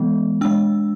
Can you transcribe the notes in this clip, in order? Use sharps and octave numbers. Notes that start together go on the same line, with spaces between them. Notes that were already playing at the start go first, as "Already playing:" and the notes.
Already playing: E3 G#3 B3
G#3 D4 E6